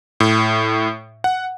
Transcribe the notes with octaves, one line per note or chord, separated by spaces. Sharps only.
A2
F#5